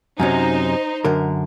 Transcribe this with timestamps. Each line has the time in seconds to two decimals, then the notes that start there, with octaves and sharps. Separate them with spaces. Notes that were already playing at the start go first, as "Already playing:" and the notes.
0.20 F#2 C3 C#4 D#4 C5
1.05 F#2 D3 A#4